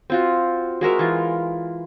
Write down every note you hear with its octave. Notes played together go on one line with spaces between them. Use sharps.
C4 F4 F#4
G#3 F#4 A#4 E5
E3 F4